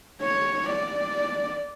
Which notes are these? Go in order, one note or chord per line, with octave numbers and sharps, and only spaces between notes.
C#5
D5